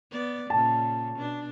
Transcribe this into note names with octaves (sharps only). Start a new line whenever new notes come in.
B3 D5
A#2 C#3 A5
B2 D4